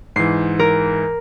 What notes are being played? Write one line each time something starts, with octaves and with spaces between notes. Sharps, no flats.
G#2 E3 C7
A#4